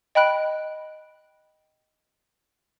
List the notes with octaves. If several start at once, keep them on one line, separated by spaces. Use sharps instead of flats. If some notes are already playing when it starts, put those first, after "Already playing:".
D#5 G5 B5 F#6 D7